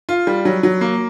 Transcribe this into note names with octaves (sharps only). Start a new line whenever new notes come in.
F4
G3
F#3
F#3
A#3